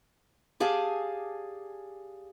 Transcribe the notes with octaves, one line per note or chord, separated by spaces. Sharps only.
G4 G#4 D5 F5 G#5 A5